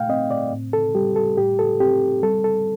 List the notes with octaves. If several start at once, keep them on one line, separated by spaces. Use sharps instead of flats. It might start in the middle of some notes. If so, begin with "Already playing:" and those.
Already playing: A#2 A3 F5 G5
C4 D#5
D5
A2
A4
G3 G4
A4
A2 G4
A4
C4 G4
G3 A4
A4